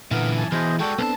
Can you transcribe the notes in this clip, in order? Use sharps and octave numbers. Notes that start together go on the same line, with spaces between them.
F#2 A#2 D3 E3 B3 A#4 B4
G#5 A5
B2 E3 E4 G#4 C5 D#5
G#3 D4 F#4 A4 G5
B1 B3 C4 D4 A4 A5